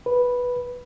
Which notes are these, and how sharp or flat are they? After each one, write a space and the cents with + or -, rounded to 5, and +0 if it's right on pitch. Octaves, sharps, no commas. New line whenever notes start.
B4 -5